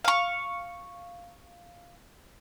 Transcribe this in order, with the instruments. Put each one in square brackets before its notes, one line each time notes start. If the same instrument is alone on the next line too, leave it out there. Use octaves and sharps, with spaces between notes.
[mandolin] F5 C#6